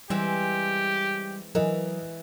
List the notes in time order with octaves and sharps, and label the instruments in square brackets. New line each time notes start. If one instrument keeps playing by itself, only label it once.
[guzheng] E3 G#3 C4 [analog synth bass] G3 [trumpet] G4
[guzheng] E3 [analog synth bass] F#3 [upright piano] A#4 D#5